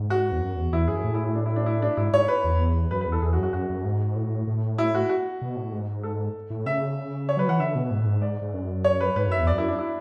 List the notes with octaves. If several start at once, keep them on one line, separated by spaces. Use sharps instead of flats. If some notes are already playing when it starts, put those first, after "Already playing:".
Already playing: G#2
F#4
E2
F#2
E2
E2 E4
F#2 G#4
A2
E4
E4
D4
E4
D4
E4
D4
G#2 E4
G#2 C#5
B4
E2
F#2 B4
B4
E2
A4
E2 G#4
F#4
F#2
F#4
F#2 F#4
F#2
G#2
A2
A2
E4
F#4
F#4
B2
A2
G#2
A4
A2
C#3 E5
C#5
F#3 B4
E3 F#5
D3 E5
B2
G#2
A2
G#2
D5
G#2
F#2
C#5
B4
G#2 B4
F#2 E5
E2
D5
F#2
E4
D4
E4